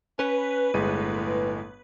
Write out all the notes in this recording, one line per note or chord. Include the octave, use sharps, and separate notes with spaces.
C#4 B4
G1 A2 G#3 D#7